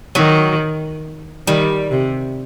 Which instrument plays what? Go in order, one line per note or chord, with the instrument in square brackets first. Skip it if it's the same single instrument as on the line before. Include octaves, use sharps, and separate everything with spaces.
[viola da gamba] D#3 [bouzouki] F#3
[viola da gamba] D#3 [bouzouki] G3
[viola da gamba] C3